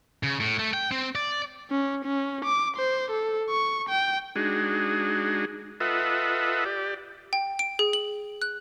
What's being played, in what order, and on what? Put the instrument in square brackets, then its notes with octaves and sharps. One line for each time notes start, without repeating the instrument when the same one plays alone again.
[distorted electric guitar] C#3
A2
A3
G5
C4
D5
[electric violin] C#4
C#4
D6
C5
A4
C#6
G5
[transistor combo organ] G#3 D4 D#4 F#4 G#4
F4 A4 B4 D#5 E5 F#5
G4 D5
[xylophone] G5
D7
G#4
F#7
F#6